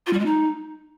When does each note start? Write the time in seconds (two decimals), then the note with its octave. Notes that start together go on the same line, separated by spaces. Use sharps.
0.07 F4
0.13 G3
0.19 G#3
0.26 D#4